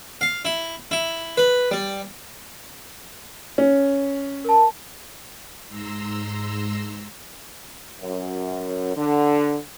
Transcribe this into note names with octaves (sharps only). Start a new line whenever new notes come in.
F5
E4
E4
B4
G3
C#4
A#4 A5
G#2 A#5 C6 E6
F#2
D3